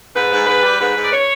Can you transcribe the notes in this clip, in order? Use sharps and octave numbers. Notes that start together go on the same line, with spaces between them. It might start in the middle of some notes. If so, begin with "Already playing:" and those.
G#2 B4
G#2
G#2 B4
G3
G#2 B4
G#2
D5
C#5